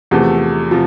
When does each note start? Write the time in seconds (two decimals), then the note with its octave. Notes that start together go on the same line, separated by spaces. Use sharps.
0.11 E2 C3 F3 A3
0.71 C3 F3